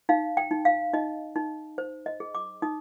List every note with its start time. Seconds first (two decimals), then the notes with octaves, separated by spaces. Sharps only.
0.09 D#4 F5
0.37 G5
0.51 D#4
0.65 F5
0.93 D#4 D#5
1.36 D#4
1.78 C5
2.06 D#5
2.20 G#4
2.35 D6
2.62 D#4 D#6